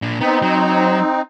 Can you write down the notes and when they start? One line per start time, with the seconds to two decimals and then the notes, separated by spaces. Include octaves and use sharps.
0.02 A#2 D4
0.20 B3 C4 D#4
0.42 F#3